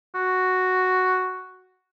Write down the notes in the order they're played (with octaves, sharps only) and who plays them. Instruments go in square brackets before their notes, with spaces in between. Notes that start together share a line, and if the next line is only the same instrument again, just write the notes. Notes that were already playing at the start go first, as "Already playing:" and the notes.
[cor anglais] F#4